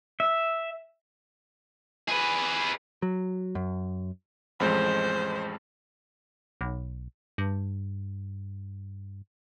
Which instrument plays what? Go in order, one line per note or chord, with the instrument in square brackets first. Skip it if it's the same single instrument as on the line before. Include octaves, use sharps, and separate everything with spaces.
[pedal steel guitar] E5
[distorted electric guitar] G#4 B4
[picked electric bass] F#3
F#2
[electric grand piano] A1 F2 G#3 [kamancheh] C5
[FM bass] B1
G2